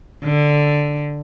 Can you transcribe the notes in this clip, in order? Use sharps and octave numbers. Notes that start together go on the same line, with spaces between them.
D3